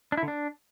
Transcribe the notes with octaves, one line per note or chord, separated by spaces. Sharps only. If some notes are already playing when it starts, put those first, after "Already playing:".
D4
E4
D3
D4